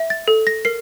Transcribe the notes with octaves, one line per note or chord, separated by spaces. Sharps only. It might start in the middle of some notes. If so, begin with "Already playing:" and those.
Already playing: E5
A6
A4
A#6
A#4 C7